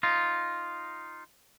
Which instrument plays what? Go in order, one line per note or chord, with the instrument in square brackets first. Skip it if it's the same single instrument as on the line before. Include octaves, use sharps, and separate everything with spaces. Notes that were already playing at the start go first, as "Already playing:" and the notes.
[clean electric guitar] D#4 F4